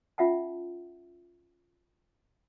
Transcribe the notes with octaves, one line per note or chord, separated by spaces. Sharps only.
C#4 F4 E5 F#5 A5